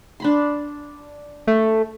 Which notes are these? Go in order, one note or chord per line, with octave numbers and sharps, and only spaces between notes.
D4 B5 C6
A3